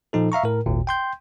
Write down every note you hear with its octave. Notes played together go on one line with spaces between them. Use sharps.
A#2 F3 D#4 A4
E5 F5 A#5 C#6
A2 A#4
G#1 D#2 A#2
G5 C6 G6